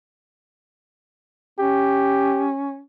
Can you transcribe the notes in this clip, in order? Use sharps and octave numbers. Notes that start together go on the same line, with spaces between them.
C#4 G4